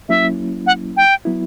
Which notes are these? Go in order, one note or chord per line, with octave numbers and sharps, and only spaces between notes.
F#3 A#3 C#4 E4 E5
F#5
G5
F#3 B3 E4